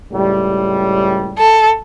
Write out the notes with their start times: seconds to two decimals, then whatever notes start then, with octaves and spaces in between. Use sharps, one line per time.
0.13 C#2 A2 G3
1.39 A4